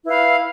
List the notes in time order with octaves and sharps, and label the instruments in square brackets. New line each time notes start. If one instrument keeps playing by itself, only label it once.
[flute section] E4 B4 F5 B5